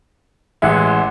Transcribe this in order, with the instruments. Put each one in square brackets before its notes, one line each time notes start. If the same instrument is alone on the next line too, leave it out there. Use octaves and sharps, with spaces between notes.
[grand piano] A1 G#3 [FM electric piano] E5 F#5